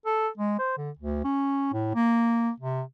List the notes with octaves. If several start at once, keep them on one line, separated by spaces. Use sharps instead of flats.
A4
G#3
C5
D3
D2
C#4
A2
A#3
C3